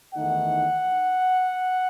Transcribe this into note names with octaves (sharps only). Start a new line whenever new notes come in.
E2 D#3 A3 D#4 F#5